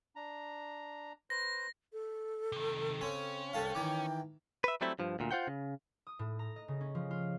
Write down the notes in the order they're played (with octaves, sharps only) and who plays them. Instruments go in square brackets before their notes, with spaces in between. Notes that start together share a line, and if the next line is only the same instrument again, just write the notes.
[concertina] D4 A#5
[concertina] B4 C5 [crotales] A#6
[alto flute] A4
[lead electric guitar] C3 D#3
[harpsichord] C#3 C4 [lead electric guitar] C#4
[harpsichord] C2 A4 F5 [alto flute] G5
[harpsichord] D#3 E3 D6
[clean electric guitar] B4 E5
F#3 G3 A3 C4 E4
G2 F3
D2 A#2
F4 C5 F#5 G5
C#3
[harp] D#6
A2
A#5
D#5
C#3
C#4
F3
F4